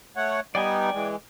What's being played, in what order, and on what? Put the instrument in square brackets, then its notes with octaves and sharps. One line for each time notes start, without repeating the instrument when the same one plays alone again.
[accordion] A3 C#5 F#5
[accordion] G3 B3 D#4 [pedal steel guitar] D5 G5 G#5
[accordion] E3 G#3